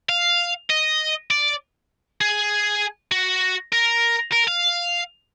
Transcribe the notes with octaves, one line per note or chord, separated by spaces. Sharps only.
F5
D#5
D5
G#4
F#4
A#4
A#4
F5